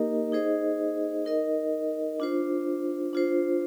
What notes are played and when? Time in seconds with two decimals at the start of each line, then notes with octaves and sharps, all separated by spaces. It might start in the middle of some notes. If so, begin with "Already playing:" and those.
Already playing: A#3 D#4 G4 A#4 D#5
0.32 D#4 G#4 C5 D#5
1.26 D#4 A#4 D#5
2.20 D4 F4 C5
3.13 D4 F4 C5